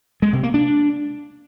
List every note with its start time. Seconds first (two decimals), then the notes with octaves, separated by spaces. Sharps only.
0.22 G#3
0.33 C3
0.43 A#3
0.54 D4